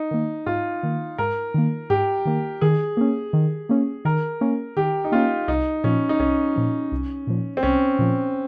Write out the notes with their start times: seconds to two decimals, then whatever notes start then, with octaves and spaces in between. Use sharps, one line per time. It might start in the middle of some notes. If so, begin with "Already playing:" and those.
Already playing: D#4
0.11 D#3 A#3
0.46 G#2 F4
0.83 D#3 A#3
1.18 G#2 A#4
1.54 D#3 A#3
1.90 G#2 G4
2.25 D#3 A#3
2.61 D#3 G#4
2.97 A#3 C#4
3.33 D#3
3.69 A#3 C#4
4.05 D#3 A#4
4.41 A#3 C#4
4.77 D#3 G4
5.04 D#4
5.12 A#3 C#4 F4
5.48 C2 D#4
5.84 A#2 F3 C#4
6.09 D#4
6.20 C2 C#4
6.56 A#2 F3
6.92 C2
7.27 A#2 F3
7.57 C4
7.63 C2 C#4
7.99 A#2 F3